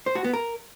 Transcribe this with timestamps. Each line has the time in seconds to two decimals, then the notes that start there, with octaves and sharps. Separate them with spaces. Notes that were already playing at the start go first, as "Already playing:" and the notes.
0.06 C5
0.15 F#4
0.24 B3
0.33 A#4